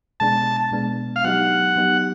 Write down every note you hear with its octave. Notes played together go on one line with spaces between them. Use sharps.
B2 G#3 B3 D4 A5
B2 G#3 B3 D4
F5
F#3 B3 D#4 G4 F#5
F#3 B3 D#4 G4